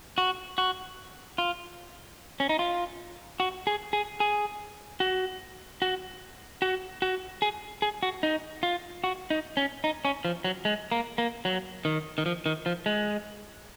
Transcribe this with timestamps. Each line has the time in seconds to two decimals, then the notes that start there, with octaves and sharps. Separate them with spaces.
0.18 F#4
0.58 F#4
1.38 F4
2.40 C#4
2.49 D#4
2.59 F4
3.40 F#4
3.67 G#4
3.93 G#4
4.20 G#4
5.00 F#4
5.82 F#4
6.62 F#4
7.02 F#4
7.42 G#4
7.82 G#4
8.03 F#4
8.23 D#4
8.63 F4
9.04 F#4
9.30 D#4
9.57 C#4
9.84 D#4
10.05 C#4
10.25 F3
10.44 F#3
10.65 G#3
10.92 A#3
11.18 A#3
11.45 F#3
11.85 D#3
12.18 D#3
12.26 F3
12.46 D#3
12.66 F3
12.86 G#3